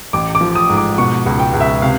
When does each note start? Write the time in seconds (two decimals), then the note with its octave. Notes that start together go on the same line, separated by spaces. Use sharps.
0.13 A1 D6
0.35 D6
0.41 F3
0.55 D#6
0.69 G#2
0.77 D6
0.98 B2 C#6
1.26 C#2
1.39 G5
1.54 C#2
1.60 E5
1.82 C3 F5